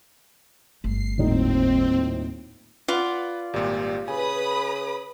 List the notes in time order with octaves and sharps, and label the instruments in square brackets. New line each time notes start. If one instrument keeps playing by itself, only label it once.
[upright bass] G1 A3 [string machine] C7
[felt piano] D#1 A2 D#4 [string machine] C4
[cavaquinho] F4 D5 [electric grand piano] B4 F#5
[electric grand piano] G#1 A#2 [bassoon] G3
[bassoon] C#3 [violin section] B4 B5 D#6 [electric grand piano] G#5